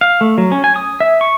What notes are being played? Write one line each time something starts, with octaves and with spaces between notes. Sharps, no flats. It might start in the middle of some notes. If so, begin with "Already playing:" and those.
F5
A3
F#3
C#4
G#5
D#6
E5
C#6